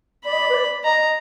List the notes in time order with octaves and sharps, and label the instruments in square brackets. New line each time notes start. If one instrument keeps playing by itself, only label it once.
[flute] D5 [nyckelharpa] B5
[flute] D#5
D5
B4
D5
[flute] D#5 [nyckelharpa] A#5